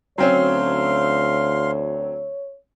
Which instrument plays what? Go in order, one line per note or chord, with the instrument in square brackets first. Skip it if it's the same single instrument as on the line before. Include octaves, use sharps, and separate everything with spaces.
[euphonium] D2 [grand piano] F#3 C4 C#4 [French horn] C#5 [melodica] F5 C6